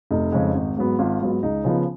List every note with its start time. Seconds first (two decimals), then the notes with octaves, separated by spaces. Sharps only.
0.11 F1 D#4
0.32 F2 C#3 G#3
0.54 G#1
0.77 G#2 F#3 B3
0.99 G#1 F4
1.20 G#2 F#3 B3
1.43 C#2 D#4
1.64 C#3 F3 B3